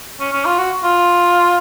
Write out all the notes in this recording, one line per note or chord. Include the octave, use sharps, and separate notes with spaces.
C#4
C#4
F4
F#4
F4